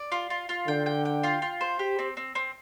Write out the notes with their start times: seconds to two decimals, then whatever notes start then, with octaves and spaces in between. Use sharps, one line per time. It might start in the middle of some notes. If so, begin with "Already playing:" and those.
Already playing: D5
0.12 F4
0.30 F4
0.49 F4
0.68 D3 G5
0.86 G5
1.05 G5
1.24 F4
1.42 F4
1.61 C5
1.79 G4
1.99 C4
2.17 C4
2.35 C4